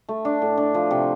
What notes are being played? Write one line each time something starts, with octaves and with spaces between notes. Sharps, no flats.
A3
D4
A2
D4
F3
C3